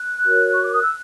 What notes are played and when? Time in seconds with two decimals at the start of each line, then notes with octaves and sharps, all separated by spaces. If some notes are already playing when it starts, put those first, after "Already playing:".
Already playing: F#6
0.24 F#4 A#4 C#5
0.54 C#6
0.63 D6
0.72 D#6
0.82 E6